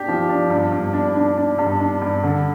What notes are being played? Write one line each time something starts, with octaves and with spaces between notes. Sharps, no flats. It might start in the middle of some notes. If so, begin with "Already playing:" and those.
Already playing: D4 G4
F3
D4
G2
G2
D4
D4
D4
G2
D4
G2
D3